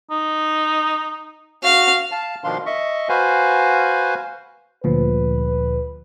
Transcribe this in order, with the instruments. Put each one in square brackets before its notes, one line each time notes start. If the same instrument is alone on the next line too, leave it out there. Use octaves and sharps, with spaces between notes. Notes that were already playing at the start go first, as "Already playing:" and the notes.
[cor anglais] D#4
[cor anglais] F#4 [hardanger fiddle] F5
[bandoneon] F5 A5
B2 D#3 F3 D4 F5 C6
D#5 E5 C#6
F#4 B4 C5 F5 G#5
[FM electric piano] D2 A#2 F3 [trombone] B4